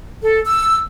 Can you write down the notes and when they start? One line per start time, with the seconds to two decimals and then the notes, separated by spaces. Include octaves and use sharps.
0.21 A4
0.46 E6